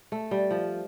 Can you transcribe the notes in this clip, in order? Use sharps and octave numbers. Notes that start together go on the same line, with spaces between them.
A3
G3
F3